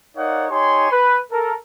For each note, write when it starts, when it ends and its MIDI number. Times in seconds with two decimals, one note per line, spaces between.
0.16 0.45 63
0.16 0.45 70
0.16 0.45 73
0.16 0.45 74
0.16 0.45 77
0.16 0.45 78
0.50 0.86 63
0.50 0.86 67
0.50 0.86 73
0.50 0.86 80
0.50 0.86 84
0.91 1.17 71
1.31 1.52 69
1.31 1.52 70